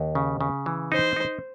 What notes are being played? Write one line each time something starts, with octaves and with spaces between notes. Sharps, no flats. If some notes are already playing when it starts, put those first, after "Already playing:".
Already playing: D#2
C#3
C#3
E3
D#4 C5
D#4